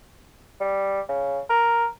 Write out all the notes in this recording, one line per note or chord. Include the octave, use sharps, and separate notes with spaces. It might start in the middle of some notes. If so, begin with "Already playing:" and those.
G3
C#3
A#4